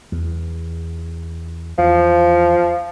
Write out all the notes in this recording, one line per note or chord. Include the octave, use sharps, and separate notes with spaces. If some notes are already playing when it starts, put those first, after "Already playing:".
E2
E2 F3